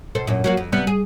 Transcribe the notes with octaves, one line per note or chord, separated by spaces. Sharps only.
B2 A4 C5
F#2 A#2
F#3 A#3 F#4
F2
C3 G3 B3
G#4